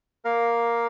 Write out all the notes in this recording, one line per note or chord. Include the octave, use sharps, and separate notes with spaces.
A#3 A#4 F5